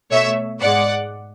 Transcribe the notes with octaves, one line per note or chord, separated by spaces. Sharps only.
B2 A3 C#5 E5
G#2 G#3 D5 F#5